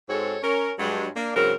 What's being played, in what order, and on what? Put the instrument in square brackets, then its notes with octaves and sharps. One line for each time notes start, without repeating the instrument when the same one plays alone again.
[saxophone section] G#2 G#3 C4 F#4 A4 C#5
C#4 A#4
G2 F#3 G#3
A#3 D4
G#2 C#3 F#3 C4 A#4